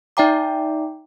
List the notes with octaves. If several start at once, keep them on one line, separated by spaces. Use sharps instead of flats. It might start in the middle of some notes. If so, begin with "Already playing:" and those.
D#4 D5 E5 G5 A#5 D6